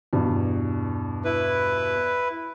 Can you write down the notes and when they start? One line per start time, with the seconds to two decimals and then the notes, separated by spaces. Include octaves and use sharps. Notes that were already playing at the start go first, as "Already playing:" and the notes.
0.13 E2 G2 B2
1.25 E4 B4